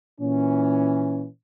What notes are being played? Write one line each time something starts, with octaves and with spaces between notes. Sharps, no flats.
A#2 E3 C#4